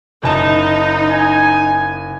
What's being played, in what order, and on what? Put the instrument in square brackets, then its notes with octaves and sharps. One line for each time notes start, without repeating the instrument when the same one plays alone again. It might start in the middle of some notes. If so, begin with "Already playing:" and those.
[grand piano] F#1 A5 E7 [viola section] D#4
[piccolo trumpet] G#5